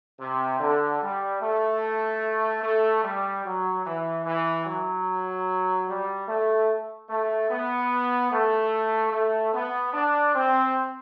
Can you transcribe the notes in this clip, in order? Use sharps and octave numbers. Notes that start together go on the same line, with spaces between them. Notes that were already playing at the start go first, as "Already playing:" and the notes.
C3
D3
G3
A3
A3
G3
F#3
E3
E3
F#3
G3
A3
A3
B3
A3
A3
B3
D4
C4